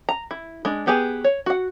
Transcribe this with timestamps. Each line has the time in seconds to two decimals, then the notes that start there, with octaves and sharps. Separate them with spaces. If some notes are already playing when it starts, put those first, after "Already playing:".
0.09 A#5
0.31 E4
0.65 G#3 D4
0.87 B3 G4 G#4 G#5
1.24 C#5
1.46 F#4 F#5